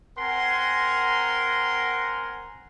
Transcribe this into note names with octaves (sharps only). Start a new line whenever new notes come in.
C4 A#4 F#5 G#5 A#5 C6